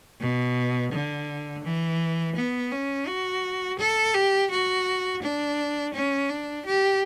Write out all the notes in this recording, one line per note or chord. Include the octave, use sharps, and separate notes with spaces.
B2
D3
E3
B3
C#4
F#4
A4
G4
F#4
D4
C#4
D4
G4